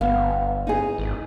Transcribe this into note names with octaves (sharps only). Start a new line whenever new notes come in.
G1 B3 F5
D#4 G#4
G#1